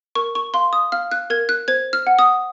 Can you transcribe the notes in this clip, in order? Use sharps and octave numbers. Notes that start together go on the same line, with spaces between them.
A#4 C#6
C#6
F5 C6
D#6
F5 F6
F#6
A#4 G#6
F#6
C5 G#6
F6
F#5
D#6